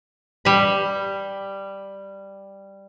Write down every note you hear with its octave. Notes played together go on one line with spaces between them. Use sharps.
G3 B5